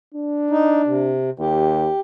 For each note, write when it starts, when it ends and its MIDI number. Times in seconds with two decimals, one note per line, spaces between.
0.14 1.20 62
0.50 0.82 63
0.86 1.30 48
1.39 1.90 39
1.39 2.00 67